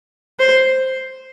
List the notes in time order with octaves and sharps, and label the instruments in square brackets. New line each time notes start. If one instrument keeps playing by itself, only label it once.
[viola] C5